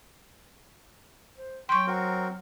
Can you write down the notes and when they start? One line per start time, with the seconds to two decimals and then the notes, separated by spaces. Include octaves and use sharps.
1.38 C5
1.69 F#3 G5 C6 C#6
1.87 C4 F#4 A#4